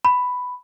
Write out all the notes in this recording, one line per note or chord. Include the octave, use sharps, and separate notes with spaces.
B5